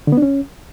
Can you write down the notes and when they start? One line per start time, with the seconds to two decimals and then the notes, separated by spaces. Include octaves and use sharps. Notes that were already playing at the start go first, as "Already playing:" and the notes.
0.07 D3
0.12 B3
0.17 D4
0.22 C#4